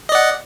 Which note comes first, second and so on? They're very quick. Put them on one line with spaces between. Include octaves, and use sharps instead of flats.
D#5 D5 F#5